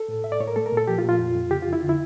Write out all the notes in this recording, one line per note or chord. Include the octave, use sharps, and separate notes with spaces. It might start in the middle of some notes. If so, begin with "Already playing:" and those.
Already playing: A4
A2
A2 E5
D5
A2 C#5
A#4
A3 A4
A#4
A#2
A4
F3 G4
F4
A#2
F4
F2
F2
C#3 G4
F4
F2
E4
D3 F4
E4